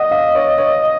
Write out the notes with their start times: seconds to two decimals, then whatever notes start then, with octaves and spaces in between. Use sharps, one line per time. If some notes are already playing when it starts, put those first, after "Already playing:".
Already playing: D#5 F#5
0.11 F5
0.35 C#5
0.58 C#5